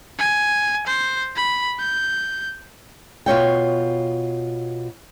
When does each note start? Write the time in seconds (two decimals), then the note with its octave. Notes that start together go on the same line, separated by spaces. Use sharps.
0.19 G#5
0.87 C5
1.36 B5
1.79 G6
3.26 B2 F4 C#5 G5